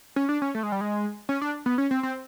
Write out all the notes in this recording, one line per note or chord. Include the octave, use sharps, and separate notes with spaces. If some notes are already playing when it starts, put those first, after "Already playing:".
C#4
D4
C#4
A3
G#3
G3
G#3
C#4
D4
B3
C#4
C4
C4